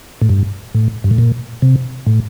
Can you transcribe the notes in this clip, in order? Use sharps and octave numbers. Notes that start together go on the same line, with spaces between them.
A2
G2
A2
G2
A2
A#2
C3
A2